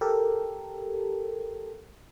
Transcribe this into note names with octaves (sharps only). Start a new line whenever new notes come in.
G4 A4 A#4